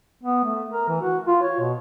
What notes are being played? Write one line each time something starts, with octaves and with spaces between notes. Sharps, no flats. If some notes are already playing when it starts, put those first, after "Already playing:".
B3
A3
A#4
E3
F#4
F4
C#5
B2